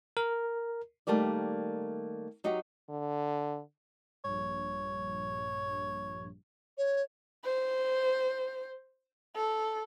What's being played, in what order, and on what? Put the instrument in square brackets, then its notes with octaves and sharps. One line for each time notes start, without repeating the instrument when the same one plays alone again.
[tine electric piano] A#4
[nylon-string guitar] D#3 G3 A3 A#3 G4 D5
F#3 D#4 F#4 G4
[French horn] D3
[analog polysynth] A#1 G2 [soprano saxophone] C#5
[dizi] C#5
[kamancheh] C5
A4